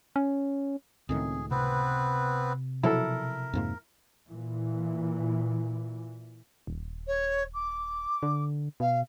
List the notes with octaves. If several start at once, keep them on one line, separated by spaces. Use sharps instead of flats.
C#4
C#2 A2 D#3 C4 G#4
C3 B3 C4 B4
B2 F3 F#3 E4 A4 A#4
F2 G#2 A#3
A#2 E3
D#1
C#5
D6
D3
B2 F5